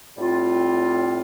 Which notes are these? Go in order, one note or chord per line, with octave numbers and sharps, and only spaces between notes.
A2 G3 C4 F4